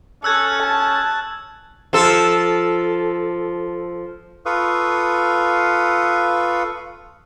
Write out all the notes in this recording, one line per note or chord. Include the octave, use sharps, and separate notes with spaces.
C#4 A4 E6 F#6 G#6
A5
F3 A4
F4 A4 B4 F5 C#6 D#6